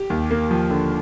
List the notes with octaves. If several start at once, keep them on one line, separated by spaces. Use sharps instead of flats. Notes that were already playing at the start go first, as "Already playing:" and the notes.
Already playing: G4
D#2
A#3
F3
D3